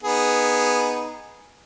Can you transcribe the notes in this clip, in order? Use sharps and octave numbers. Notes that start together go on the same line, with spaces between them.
B3 D#4 G#4